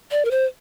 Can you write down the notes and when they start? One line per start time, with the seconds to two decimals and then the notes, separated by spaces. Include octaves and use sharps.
0.12 D5
0.25 A#4
0.31 C5